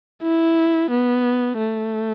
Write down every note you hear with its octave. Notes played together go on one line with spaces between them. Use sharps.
E4
B3
A3